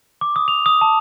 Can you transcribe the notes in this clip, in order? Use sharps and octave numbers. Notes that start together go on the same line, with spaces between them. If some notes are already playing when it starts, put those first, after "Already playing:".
D6
D#6
F7
D#6
A5